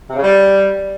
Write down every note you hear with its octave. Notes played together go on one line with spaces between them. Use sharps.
C3
C#3
G3